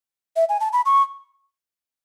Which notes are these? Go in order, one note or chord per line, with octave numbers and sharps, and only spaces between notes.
E5
G#5
A5
B5
C#6